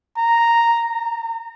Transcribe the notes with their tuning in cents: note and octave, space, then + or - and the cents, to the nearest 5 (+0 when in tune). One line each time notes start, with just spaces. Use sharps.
A#5 -5
A#5 -35